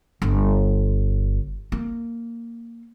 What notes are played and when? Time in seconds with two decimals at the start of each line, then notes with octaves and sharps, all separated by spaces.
0.22 G1
1.72 A#3